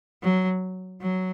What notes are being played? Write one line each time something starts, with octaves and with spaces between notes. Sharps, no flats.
F#3
F#3